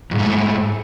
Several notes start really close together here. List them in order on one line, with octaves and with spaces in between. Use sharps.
F2 G#2 A3